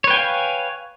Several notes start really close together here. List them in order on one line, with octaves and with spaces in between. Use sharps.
C#5 B4 G5 G#5 F5